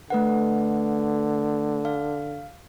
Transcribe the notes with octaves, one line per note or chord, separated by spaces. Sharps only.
D3 A3 B4 F#5
F5